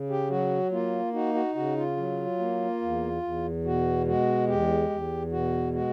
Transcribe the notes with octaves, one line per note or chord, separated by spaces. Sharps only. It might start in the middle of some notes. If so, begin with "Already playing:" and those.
Already playing: C#3
G4
F#3 F#4
A#3 F4
D#4 F#4
F#4
C#3 F#4
F4
F#3
A#3
E2
E2
B2 F#4
G#3 F#4
E2 G4
E2
B2 F#4
G#3 F#4